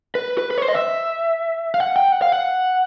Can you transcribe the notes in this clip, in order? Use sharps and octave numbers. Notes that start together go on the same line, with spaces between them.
B4
B4
B4
C#5
C5
D#5
E5
F5
F#5
G5
F#5
F5
F#5